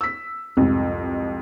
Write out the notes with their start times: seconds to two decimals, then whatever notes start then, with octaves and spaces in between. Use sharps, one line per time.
0.01 E6 B6
0.57 C2 F2 G#2